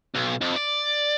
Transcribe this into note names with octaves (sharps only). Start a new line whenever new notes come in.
B1
F2
D5